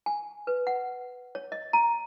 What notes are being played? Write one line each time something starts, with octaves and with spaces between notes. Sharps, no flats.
G#5
B4
F#5
C#5
D#5
A#5